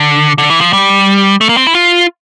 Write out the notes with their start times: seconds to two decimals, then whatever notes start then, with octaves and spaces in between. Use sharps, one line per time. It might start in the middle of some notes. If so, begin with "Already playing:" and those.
Already playing: D3
0.38 D3
0.50 E3
0.61 F3
0.73 G3
1.41 A3
1.49 A#3
1.57 C4
1.67 E4
1.75 F4